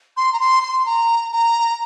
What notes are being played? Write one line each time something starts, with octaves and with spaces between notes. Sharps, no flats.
C6
A#5
C6
C6
A#5
A#5